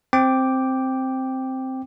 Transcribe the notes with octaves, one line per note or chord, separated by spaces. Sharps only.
C4 G5 D6